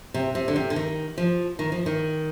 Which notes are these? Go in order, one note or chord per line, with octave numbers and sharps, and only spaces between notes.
C3
C3
D3
C3
D3
D#3
F3
D#3
F3
D#3